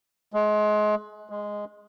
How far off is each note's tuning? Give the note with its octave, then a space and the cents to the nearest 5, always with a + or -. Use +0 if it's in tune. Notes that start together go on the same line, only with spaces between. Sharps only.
G#3 +30
G#3 -5